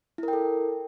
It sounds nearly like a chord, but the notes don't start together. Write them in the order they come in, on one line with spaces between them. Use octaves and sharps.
E4 A#4 G5 A4